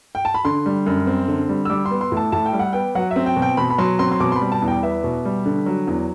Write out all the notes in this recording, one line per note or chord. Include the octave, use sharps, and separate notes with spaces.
G5
A5
B5
D3 C6
G3
F#2
C4
D3
G3
E6
G3 D6
C6
B3
C6
A2
A5
A2 A5
G5
G3
F#5
B3 G5
F#3 F#5
E5
C4
G5
B2
G5
B2 B5
B5
F#3 C6
C4 C6
C6
B2 D6
C6
B5
G3
A5
E2
G5
B3 E5
B2
G3
D3
F#3
E2